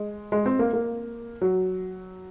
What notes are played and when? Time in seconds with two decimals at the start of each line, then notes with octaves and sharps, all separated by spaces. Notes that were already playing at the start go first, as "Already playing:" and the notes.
Already playing: G#3
0.32 G#3
0.46 C4
0.59 A#3
0.73 A#3
1.42 F#3